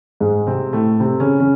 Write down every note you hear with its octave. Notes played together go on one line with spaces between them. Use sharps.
G#2 G#3
C3 C4
A2 A3
C3 C4
C#3 C#4
C#3 C#4